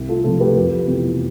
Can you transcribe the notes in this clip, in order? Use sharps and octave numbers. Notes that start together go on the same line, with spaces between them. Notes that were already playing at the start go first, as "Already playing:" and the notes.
Already playing: C2
F4 A4
C3 F3 A3 F4 A4
G4 B4
F2
C3 E3 B3